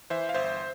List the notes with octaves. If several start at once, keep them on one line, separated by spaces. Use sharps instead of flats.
E3 C5 E5
F5
G1 C5 E5